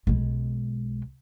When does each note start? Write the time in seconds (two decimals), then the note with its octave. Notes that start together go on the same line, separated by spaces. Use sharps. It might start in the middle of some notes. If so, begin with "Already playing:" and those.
0.07 B1 G#3